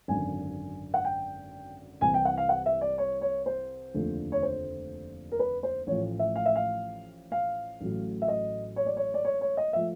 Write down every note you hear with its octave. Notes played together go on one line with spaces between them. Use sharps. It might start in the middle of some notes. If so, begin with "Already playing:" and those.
G#1 F#2 D3 G#5
F#5
G5
C2 C3 E3 G#5
G5
F#5
F5
F#5
E5
D5
C#5
C#5
C5
F1 D#2 D3 F3 A3
C#5
C5
A#4
B4
C5
A1 A2 F3 C#5
E5
F5
E5
F5
F5
A1 A2 F#3
E5
D#5
C#5
D5
C#5
D5
C#5
C#5
D#5
F3 A3 E5